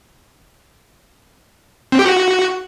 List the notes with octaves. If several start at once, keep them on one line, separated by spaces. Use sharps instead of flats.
C4
G4
F#4